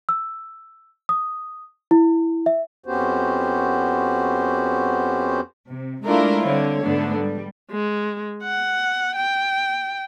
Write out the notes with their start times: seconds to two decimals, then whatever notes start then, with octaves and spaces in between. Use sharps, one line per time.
0.09 E6
1.09 D#6
1.91 E4
2.46 E5
2.86 F2 B3 C#4 F#4 G4 C5
5.68 C3
6.05 G#3 A3 D4 E4 F4 A#4
6.46 D3 G3 C4 C#5
6.82 G#2 D3 A3 B3 D4
7.20 G3
7.71 G#3
8.43 F#5
9.16 G5